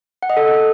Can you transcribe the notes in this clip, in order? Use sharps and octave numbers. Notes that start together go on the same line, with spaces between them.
F#5
D#5
A4